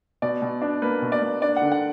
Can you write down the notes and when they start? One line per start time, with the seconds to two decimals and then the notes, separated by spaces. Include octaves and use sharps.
0.22 B2 D5
0.42 B2
0.61 D4
0.82 A#3 B4
1.02 B2
1.12 D5
1.22 A#3
1.41 D4 D5
1.57 F#5
1.62 D3
1.72 F#5